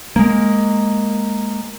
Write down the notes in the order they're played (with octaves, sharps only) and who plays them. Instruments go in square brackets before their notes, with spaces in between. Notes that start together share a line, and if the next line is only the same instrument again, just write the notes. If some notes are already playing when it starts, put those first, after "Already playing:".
[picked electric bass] G#3 A#3